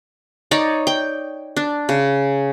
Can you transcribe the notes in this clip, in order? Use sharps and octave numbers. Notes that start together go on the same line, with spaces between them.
D#4 C#5 D5
G5
D4
C#3